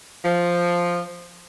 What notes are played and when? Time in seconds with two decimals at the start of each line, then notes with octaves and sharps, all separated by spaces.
0.25 F3